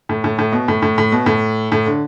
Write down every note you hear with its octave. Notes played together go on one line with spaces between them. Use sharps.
A2
A2
A2
B2
A2
A2
A2
B2
A2
A2
D3